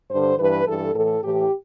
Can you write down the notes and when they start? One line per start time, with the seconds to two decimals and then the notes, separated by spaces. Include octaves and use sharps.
0.10 G2 D3 C5
0.39 G2 E3 B4
0.66 G2 E3 A4
0.94 A2 E3 A4
1.23 A2 E3 G4